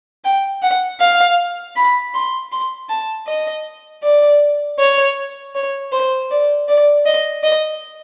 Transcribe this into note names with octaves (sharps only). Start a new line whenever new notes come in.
G5
F#5
F5
B5
C6
C6
A5
D#5
D5
C#5
C#5
C5
D5
D5
D#5
D#5